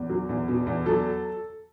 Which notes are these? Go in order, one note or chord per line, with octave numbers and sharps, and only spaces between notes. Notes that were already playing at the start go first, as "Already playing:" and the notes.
Already playing: E2
F#3
E2
B2
E2
F#3 A4